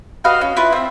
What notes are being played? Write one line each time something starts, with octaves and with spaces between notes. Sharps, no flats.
F#4 B4 D#5 F5
C#4
E4 F4 B4
C4 E5